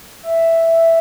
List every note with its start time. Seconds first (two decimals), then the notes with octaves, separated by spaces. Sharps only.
0.23 E5